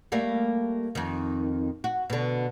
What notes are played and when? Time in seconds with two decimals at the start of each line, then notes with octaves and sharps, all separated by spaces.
0.12 G3 A3 A#3
0.95 F2 D#3
1.84 F#4
2.10 B2 D3